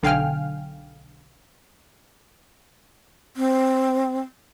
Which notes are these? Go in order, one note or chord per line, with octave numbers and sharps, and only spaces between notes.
B1 D3 F5 G5 G#5 F6
C4